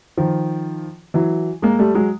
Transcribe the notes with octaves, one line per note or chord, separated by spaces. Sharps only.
D#3 F3
E3 F#3
G#3 A#3
G3 A3
F#3 G#3